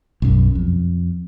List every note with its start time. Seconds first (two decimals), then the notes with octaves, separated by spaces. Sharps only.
0.22 B1 F#2
0.55 F2